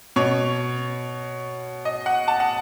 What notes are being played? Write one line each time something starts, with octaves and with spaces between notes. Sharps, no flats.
B2 C#5
D#5
F#5
A5
F#5